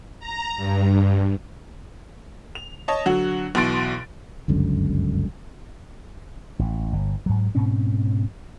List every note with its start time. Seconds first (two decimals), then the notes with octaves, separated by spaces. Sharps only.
0.19 A#5
0.56 G2
2.55 F7
2.88 C#5 D#5 A5
3.05 D3 F#3 F#4
3.55 B1 B2 E3 C6 A6 D7
4.48 G1 C#2 F#2 D3
6.59 A1
6.93 G1
7.26 G#2 F#3
7.55 G#2 B2 C4 C#4